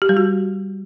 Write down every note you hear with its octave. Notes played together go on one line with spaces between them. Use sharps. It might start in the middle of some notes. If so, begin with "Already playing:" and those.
G4
G3
F#4